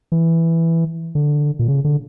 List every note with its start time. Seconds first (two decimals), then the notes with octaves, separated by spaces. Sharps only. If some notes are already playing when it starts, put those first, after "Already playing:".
0.12 E3
1.15 D3
1.59 A#2
1.68 C#3
1.85 D3